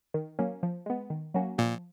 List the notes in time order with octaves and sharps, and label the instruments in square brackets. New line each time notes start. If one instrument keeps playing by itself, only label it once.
[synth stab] D#3
F#3 A#3 C#4
F3
G#3 B3
D#3
F#3 A#3 C#4 F#4
[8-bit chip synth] A#2 [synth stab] F3